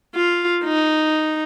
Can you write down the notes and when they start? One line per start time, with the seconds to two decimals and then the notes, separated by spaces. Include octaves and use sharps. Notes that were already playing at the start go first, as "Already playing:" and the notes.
0.15 F4
0.64 D#4